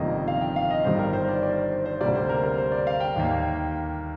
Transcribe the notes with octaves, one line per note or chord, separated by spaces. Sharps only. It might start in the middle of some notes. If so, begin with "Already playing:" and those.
Already playing: G1 F2 C3 D#3 A#3 D#5
F5
G5
F5
D#5
G1 G2 D#3 G3 C5
A#4
C5
D5
D5
C5
C5
C5
D2 C3 G3 A#3 D5
C5
A#4
A#4
C5
D5
F5
G5
D#2 D#3 A#3